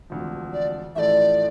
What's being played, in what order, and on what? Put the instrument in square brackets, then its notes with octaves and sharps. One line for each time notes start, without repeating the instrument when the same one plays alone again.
[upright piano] E1 D2 C3 F3
[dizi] D5
[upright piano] A1 A2 F3 A3 E4 [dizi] D5 E5